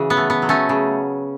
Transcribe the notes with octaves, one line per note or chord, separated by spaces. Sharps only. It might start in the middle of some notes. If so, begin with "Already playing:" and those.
Already playing: C#3 E3 F#4
B3
A3
B3
F#3
A3 C#4
C#3